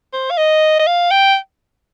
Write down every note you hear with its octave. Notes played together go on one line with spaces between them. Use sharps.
C5
F5
D#5
D#5
F5
G5